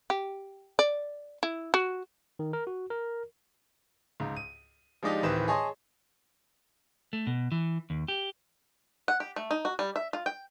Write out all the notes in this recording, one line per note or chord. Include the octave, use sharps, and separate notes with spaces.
G4
D5
E4
F#4
D#3
A#4
F#4
A#4
C#2 G#2
D#7
F3 G#3 D4 D#4 G4
D1 D#3 E3 B4 C5 E7
G#4 C#5 D#5 A5 C6
A3
B2
E3
D#2
G4
F#5
G4
A3
D#4
F#4
G3
E5
F4
G5